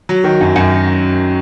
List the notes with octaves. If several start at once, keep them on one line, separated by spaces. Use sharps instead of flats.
F#3
D#3
F#2
F#2